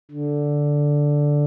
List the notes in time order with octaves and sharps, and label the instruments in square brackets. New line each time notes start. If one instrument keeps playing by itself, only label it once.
[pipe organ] D3